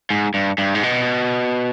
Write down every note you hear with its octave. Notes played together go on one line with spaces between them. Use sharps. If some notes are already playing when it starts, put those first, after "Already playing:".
G#2
G2
G2
G#2
B2